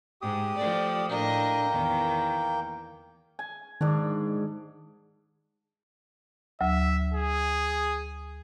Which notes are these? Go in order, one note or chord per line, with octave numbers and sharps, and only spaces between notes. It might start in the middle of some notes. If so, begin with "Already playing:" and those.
G#2 G4 D#6
F3 A3 D5
A2 A#3 D4 D#5 G5
E2 D#3
G#5
G#2 D#3 D4
D2 F#3 E5
G#4